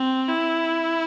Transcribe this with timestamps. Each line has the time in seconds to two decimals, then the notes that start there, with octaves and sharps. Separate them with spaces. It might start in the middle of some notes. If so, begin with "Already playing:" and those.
Already playing: C4
0.28 E4